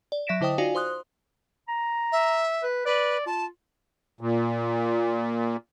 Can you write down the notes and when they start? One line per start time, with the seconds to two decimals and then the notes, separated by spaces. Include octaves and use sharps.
0.12 D5
0.27 F#3 E5 A#6 B6 D7 E7
0.41 D3 E4 C5 D#5 G5 D#6
0.58 D#4 F4 F#4 D5 F5 G#5
0.75 C5 C6 D#6 F#6
1.68 A#5
2.12 E5
2.63 B4
2.86 B4 D5
3.26 F4 A5
4.21 A#2